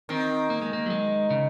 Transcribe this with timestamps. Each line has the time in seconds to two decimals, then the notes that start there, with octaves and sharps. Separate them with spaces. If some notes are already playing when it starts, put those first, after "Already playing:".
0.09 D#3 C4
0.50 A#3
0.62 G#3
0.73 A#3
0.86 F#3
0.90 G#3
1.30 C#3